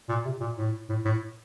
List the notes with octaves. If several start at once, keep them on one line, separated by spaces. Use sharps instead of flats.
A#2
C3
A#2
A2
A2
A2